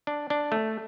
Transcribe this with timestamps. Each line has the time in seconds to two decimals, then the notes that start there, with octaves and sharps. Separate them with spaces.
0.07 D4
0.30 D4
0.52 A3